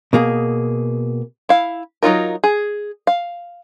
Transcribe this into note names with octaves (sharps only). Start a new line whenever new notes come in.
B2 A#3 G#4
E4 F5
F#3 D#4 F4 A#4
G#4
F5